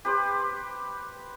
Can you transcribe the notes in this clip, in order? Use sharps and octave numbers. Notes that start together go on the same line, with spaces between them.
G4 B4 C5